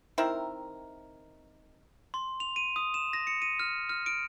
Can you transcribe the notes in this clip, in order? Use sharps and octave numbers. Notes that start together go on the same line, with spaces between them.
D#3 C4 E4 A#4
C6
F7
D#7
D#6
E7
A#6
C#7
D#7
F6
F6
D7